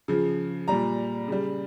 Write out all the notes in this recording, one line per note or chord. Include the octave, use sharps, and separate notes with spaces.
C#3 F3
A#2 G3 A#5
C#3 G3